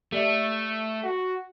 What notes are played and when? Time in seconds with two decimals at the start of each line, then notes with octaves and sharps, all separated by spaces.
0.12 A3 G4 D5 E5
1.04 F#4